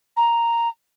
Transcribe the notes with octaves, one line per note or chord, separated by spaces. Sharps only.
A#5